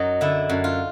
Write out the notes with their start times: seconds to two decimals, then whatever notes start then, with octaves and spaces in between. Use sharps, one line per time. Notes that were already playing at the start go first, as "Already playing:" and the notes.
Already playing: F#2 F#3 D#4
0.21 D3 E4
0.49 F#2
0.64 F4